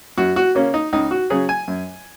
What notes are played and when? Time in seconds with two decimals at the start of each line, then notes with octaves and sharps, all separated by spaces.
0.17 F#2 F#4
0.36 F#4
0.55 C#3 A#3 C#4
0.74 D#4
0.93 C#2 D#4
1.11 F#4
1.30 C#3 F#3 C#4 G#4
1.49 G#5
1.68 F#2